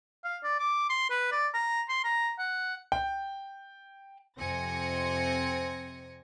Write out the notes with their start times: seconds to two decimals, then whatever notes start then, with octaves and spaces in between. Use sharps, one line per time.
0.24 F5
0.43 D5
0.60 D6
0.90 C6
1.10 B4
1.32 D5
1.54 A#5
1.89 C6
2.04 A#5
2.39 F#5
2.92 G5
4.38 F2 C3 C4 G#5 A#6 C#7